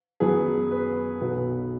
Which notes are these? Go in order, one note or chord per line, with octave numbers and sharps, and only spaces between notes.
F#2 F#3 B3 G#4
B4
B1 B2 B3